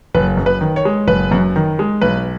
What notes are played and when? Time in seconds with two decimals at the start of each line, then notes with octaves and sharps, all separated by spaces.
0.15 F#1 B4
0.37 F#2
0.46 B4
0.61 D#3
0.76 C#5
0.85 G#3
1.08 F#1 B4
1.31 F#2
1.56 D#3
1.79 G#3
2.01 B1 B4